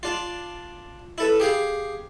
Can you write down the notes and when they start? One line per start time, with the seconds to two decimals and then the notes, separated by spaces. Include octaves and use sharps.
0.03 D4 F4
1.18 E4 A4 B4
1.40 G4 G#4 F5